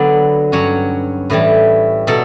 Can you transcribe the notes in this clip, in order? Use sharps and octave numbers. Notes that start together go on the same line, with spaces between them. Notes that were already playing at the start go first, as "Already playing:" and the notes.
Already playing: D3 F#3 B3 D5
G2 F#3 C#4 C#5
A2 E3 G3 B4
B2 F#3 A4